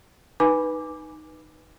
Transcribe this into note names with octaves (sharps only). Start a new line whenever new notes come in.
D#4 B4 G#5 D6